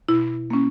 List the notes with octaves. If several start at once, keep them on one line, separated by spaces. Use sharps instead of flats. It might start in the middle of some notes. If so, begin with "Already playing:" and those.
B2 E4
A#3 C#4